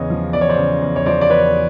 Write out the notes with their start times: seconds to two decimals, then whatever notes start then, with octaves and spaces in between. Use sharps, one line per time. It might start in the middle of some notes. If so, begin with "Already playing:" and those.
Already playing: E2 C#3 C#5 D#5
0.10 F3
0.33 E2 D5
0.41 C#5
0.50 C5 D5
0.58 C#3
0.81 E2
0.96 C#5
1.06 F3 C5 D5
1.21 D5
1.30 E2 B4 C#5